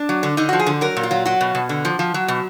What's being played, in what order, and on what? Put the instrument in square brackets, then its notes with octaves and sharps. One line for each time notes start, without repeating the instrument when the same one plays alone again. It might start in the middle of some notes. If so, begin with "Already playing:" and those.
Already playing: [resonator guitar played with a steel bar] D4
F#3
D3
D3 D#4
F3 F#4
G#4
D3
F#3 A#4
A#2
F4
F#3
F#3 F#4
B2
B2
D3
F3
F3
F#3
B2